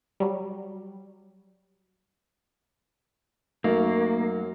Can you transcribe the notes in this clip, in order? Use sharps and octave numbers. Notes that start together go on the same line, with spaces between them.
F#3 G3
F#2 F#3 A3 A#3 D#4